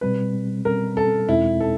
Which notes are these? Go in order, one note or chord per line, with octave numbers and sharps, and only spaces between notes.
B2 G3 C4 B4
B2 G3 C4 A#4
A4
E2 B2 G#3 C4 D#4 E4
A4